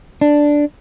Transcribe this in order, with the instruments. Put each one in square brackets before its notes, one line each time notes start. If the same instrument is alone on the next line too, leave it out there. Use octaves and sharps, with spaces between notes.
[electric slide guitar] D4